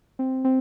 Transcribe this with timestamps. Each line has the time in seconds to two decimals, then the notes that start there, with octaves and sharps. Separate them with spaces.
0.19 C4
0.45 C4